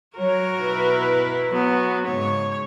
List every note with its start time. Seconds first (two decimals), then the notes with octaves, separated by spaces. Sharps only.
0.17 F#3 F#4 A#4 C#5
0.60 B2 E4 B4
1.49 F#3 B3
2.07 G#2 C#3 C#5